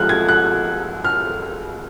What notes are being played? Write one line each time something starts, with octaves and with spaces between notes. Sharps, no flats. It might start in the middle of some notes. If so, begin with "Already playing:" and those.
Already playing: G#2 F3 G#3 F6 F#6
G#6
F#6
F6